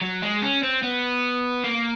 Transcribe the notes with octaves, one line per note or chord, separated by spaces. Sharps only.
F#3
G#3
C#4
C4
B3
A#3